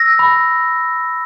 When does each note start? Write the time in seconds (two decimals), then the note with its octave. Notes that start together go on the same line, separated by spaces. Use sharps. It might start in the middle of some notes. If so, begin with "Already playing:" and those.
Already playing: E6 A#6
0.19 B5